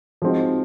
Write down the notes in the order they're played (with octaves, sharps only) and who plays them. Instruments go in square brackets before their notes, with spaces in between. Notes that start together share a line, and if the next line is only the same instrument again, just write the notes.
[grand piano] F3 G#3 C4 D#4 F#4